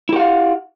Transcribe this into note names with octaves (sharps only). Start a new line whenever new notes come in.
E4 G4 F5 F#5